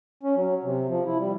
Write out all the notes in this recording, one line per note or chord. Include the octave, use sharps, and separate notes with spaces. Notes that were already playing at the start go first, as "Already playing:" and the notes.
C#4
F#3
C3
F3
E4
G3